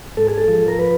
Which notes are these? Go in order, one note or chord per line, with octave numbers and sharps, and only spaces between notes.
G#2 A4
G#4
A4
F3
A#4
B4